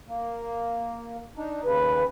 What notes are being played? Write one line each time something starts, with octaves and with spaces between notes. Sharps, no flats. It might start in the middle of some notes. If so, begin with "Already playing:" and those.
A#3
D4 D#4
D#2 C#3 B4